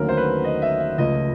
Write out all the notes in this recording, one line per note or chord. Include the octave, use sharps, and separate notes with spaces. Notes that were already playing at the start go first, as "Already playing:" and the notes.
Already playing: D#2 D3 F#3 A3 C#4 A#4
C5
B4
D#5
E5
E5
C#2 C#3 F3 A3 D#5